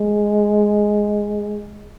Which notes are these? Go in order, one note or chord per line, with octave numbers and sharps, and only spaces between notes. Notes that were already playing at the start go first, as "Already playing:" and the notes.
Already playing: G#3